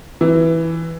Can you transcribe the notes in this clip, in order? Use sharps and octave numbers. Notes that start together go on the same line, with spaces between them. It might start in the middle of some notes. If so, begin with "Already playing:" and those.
E3